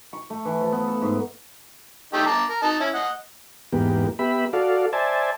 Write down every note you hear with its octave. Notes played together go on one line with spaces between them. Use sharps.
C#6
A3
E3
F3
B3
A4
G#2
A3 D#4 G4
A5 A#5 D6
A#4
D#4 A5
C#4 E4
D#5 F#5
E2 G#2 A#3 B3 G4
B3 G4 E5 B5
F#4 A4 D5 F5
C5 D5 E5 G#5 A5